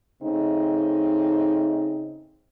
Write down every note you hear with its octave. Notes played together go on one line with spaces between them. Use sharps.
C#3 A3 C4 D#4